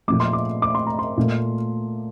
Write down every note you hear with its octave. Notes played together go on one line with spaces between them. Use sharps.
A#2 F3 A3 D6
C6
D6
D6
C6
A#5
C6
A#2 A3